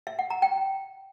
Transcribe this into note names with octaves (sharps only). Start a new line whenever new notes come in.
E5
F#5
A#5
G5